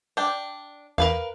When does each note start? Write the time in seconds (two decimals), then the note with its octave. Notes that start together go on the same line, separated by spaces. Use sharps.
0.17 D4 G5
0.98 E2 A#4 B4 F5